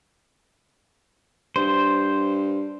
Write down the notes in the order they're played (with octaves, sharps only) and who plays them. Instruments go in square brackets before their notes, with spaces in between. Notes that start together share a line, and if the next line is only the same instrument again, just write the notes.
[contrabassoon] G2 [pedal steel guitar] C5